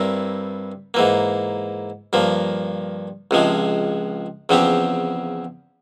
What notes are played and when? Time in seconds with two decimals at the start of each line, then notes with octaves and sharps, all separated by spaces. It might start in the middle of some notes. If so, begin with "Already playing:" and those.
Already playing: G2 G3 C4 E4 A#4
0.94 G#2 E3 A#3
2.13 G2 F3 A#3
3.31 C#2 C3 F3 G#3
4.49 E2 C#3 F3 C4 G4